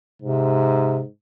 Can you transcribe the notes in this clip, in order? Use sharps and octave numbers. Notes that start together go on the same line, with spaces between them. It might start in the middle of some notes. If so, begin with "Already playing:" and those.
G#2 C3